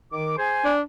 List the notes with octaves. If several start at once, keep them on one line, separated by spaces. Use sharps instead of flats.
D#3 D6
G#4 C5 G#5
D4